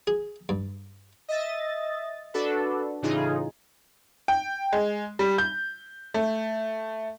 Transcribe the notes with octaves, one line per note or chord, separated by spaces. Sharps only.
G#4
G2
D#5 E5 A6
D4 F#4 A4 B4
A2 C#3 E3 D#4 F4 G#4
G5
G#3
G3
G6
A3